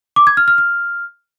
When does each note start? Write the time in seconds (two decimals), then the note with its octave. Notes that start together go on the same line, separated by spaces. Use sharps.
0.16 D6
0.27 G#6
0.37 F6
0.48 F6
0.58 F6